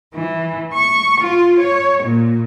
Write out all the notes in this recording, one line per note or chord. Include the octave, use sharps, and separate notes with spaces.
E3
C#6
F4
C#5
A#2